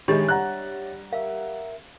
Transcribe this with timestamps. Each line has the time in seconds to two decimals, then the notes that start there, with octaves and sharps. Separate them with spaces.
0.08 D#3 G#3 D4 G4 C#5 E5 B5 A6
0.28 G3 F#5 A#5 F#6
1.13 A#4 E5 F5